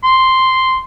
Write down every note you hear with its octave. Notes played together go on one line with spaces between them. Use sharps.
C6